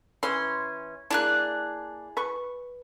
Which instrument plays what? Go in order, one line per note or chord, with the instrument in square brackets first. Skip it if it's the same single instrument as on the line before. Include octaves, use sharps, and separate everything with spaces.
[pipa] E3 C#4 [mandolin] C6
[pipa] A#3 D4 [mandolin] E4 G#4 F#6
[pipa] B4 C#6